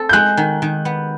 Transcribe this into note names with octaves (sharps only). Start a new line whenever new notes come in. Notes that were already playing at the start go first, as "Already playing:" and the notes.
Already playing: C4 A4
G6
G#3 F#6
D#3
D#3
B3